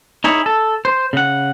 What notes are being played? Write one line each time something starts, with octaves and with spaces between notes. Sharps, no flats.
D#4 E4 G#4 C#5
A4
C5
C#3 F#5